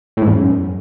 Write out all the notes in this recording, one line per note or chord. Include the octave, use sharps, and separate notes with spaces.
A2
G#2
E2
F#2